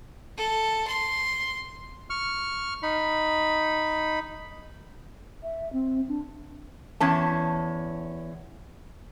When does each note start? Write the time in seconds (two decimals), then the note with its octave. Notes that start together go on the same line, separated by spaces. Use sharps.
0.37 A4
0.87 C6
2.10 C#6 F6
2.83 D#4 B5
5.43 E5
5.73 C4
6.08 D4
7.00 E2 C#4 A5